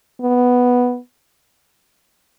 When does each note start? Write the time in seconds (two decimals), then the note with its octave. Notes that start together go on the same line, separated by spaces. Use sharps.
0.21 B3